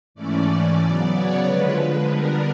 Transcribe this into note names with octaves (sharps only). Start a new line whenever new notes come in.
G#2 E3 A3 C#4 D5
C#3 F#3 B3 D5
C#5
D3 F3 G#3 B4
D3 G3 B3 D4 A#4